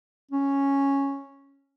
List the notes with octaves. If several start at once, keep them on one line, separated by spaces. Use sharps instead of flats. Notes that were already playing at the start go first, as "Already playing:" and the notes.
C#4